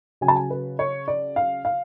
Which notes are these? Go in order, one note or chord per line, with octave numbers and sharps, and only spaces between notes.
C#3 F#3 G#5
A5
G#5
B4
C#5
D5
F5
F5